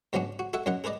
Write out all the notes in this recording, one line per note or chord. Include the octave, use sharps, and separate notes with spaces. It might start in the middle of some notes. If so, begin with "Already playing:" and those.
G#2 F#3 B3 C#4 D4 F#4
F#4
F#4 A4 E5 F#5
F#2 F#3 D#4 A#4 F#5
G#4 A#4 B4 D5 D#5